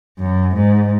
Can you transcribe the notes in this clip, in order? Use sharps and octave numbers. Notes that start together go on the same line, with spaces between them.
F#2
G#2